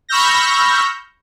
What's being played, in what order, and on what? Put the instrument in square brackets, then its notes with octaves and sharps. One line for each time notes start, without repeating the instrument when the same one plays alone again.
[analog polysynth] B5 C#6 E6 F6 G6 A#6